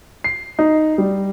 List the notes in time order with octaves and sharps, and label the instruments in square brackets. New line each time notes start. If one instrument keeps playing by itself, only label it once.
[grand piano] C7
D#4
G3